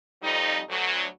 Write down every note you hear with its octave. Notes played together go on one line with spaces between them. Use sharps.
F2 G3 D#4
D2 F#3